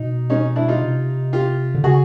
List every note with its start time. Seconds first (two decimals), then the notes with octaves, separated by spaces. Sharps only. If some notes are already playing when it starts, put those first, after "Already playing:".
Already playing: B2 D#4
0.30 C#4 D#4
0.56 D4 E4
0.68 D#4 F4
0.82 C3
1.33 F4 G4
1.75 D3
1.84 C#3 F#4 G#4